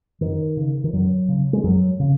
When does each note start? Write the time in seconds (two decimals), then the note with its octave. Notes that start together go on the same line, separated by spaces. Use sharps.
0.21 F#2 D#3
0.57 C#3
0.84 D#3
0.93 F#2 F#3
1.28 C#3
1.53 G#3
1.64 F#2 F#3
2.00 C#3